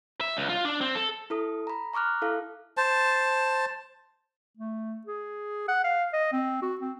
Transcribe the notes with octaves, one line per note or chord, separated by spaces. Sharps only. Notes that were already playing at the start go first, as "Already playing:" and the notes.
E5
C#2
F4
D4
C4
A4
E4 A4 D#6
A#5 B5
A#5 C#6 D6 F6 F#6
E4 A4 F5
C5 A5
A3
G#4
F#5
F5
D#5
C4
F#4
C4